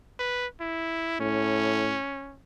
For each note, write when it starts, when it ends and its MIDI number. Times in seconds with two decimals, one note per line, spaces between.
0.19 0.47 71
0.60 1.17 64
1.20 1.96 45
1.20 2.38 61